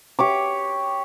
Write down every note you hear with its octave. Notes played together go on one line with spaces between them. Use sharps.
G4 C#5 D6